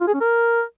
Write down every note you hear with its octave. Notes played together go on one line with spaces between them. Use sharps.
F4
G#4
C#4
A#4